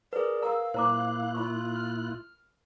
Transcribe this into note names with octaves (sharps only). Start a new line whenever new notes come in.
G#4 A#4 B4 D5
A#4 F5 A#5 E6
A#2 E4 C5 A#5 D6 F#6
F4 B5 C#6
F6